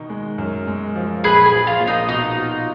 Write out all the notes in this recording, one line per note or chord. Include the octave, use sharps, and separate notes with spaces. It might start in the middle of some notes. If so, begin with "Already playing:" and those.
Already playing: B2 D#3 D#4
G#3
F#2
G#3
F3
A#1 G#4 B4
G#4
F3
F4
A#2
D#4
B2 D#4
F4